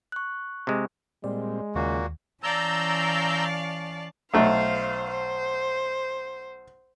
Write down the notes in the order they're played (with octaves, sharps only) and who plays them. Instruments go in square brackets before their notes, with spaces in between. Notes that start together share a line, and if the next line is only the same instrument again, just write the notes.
[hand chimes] C#6 F#6
[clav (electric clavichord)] C3 G#3
[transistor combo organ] A#2 G3 C4 [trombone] G#3 [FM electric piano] D5
[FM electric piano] D#2 [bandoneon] A#2 A#3 F#4 [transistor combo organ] C#3
[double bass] E3 C#4 [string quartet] D5 F5 A5 [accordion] A#5 E6 G6
[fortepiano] B1 A3 [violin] C5 F5
[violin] C5